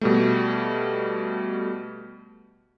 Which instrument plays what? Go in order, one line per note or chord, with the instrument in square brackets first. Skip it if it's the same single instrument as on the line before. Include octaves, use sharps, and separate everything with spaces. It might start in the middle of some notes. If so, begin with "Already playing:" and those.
[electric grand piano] B2 G3 A3